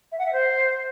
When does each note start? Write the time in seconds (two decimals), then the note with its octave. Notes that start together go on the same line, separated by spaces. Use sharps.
0.12 E5
0.19 F#5
0.26 E5
0.33 C5